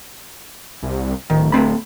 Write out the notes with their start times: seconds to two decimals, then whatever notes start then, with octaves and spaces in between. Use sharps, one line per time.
0.82 C2
1.30 D1 D#3
1.52 A3 C4 B5